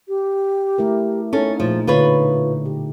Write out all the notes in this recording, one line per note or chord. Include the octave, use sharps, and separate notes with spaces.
G4
A3 E4 A#4
C#4 D#4 A4
A#2 F3 A3 G#4
B2 D3 F4 B4 C#5 D5
G4